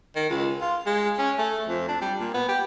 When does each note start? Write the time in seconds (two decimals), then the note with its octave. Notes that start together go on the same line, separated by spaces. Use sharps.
0.15 D#3
0.29 C#2
0.61 F4
0.86 G#3
1.18 C#4
1.38 A3
1.69 F2
1.88 D4
2.02 G3
2.20 A#2
2.34 B3
2.49 G4